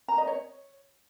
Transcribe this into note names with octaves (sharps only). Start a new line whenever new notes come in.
A#5
D#5
C#5